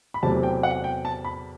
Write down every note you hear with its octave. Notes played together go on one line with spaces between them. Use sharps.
B5
E2 C3 F#3 A3 C4 A5
G5
F#5
G5
A5
B5